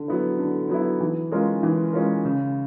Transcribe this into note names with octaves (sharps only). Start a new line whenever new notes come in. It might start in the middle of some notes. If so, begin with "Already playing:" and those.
Already playing: D3
F#3 B3 E4
D3
F#3 B3 E4
E3
G#3 C#4 F4 A#4
E3
G#3 C#4 F4 A#4
C#3